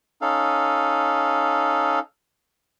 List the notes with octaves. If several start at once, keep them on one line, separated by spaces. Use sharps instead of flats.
C#4 D#4 A4 F5